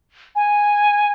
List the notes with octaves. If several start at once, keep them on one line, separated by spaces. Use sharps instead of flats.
G#5